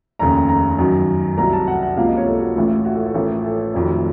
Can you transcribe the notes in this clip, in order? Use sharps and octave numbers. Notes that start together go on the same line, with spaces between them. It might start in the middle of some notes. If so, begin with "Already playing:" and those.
F1 D#2 C#3 A#5
A#5
F#2 D#3 F#3
C2 C3 F#3 A#5
A5
F#5
F#5
C#2 C3 F3 A#3 F5
D#5
C#5
A4
F#4
A1 A2 A3 F4
F4
F#4
A4
A4
A1 A2 F3 A3 A#4
A4
F1 F2 D#3 F#3